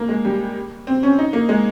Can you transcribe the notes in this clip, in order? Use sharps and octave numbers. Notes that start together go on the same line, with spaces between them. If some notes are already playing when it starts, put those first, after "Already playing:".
Already playing: A#3
G#3
G3
C4
C#4
D#4
A#3
G#3